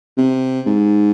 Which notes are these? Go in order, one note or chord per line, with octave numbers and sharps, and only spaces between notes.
C3
G#2